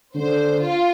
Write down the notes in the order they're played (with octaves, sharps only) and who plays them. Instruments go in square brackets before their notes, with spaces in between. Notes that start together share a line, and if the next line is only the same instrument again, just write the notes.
[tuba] D3 [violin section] C5
[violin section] F4